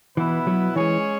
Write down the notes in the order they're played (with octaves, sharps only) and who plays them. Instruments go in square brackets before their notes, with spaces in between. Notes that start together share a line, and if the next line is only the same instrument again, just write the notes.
[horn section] B2 B3 E4 B4 [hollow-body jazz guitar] E3
[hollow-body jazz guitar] F#3
[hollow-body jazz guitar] E3 [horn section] G#3 C#4 G#4 C#5